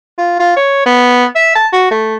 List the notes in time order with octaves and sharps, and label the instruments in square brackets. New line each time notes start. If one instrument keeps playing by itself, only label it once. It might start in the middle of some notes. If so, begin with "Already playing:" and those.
[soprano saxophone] F4
F4
C#5
B3
E5
A5
F#4
A3